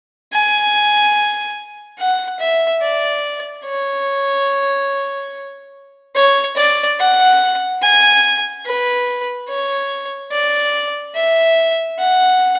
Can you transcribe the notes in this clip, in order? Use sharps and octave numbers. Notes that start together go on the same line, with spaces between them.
G#5
F#5
E5
D5
C#5
C#5
D5
F#5
G#5
B4
C#5
D5
E5
F#5